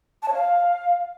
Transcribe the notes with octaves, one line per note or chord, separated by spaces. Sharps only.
A5
C#5
F5